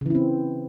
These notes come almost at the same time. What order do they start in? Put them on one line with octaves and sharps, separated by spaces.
C#3 E3 E4 C4